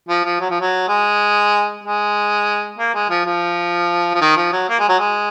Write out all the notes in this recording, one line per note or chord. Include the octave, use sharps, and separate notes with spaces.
F3
F3
F#3
F3
F#3
G#3
G#3
A#3
G#3
F3
F3
F3
D#3
F3
F#3
A#3
G#3
F#3
G#3